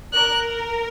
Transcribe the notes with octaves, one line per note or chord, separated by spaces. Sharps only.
A#4 F#6